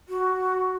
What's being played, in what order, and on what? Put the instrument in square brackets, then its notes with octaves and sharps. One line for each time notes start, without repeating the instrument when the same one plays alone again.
[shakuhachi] F#4